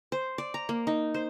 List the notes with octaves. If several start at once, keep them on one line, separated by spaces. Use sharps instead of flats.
C5
D5
A#5
A#3
D#4
C5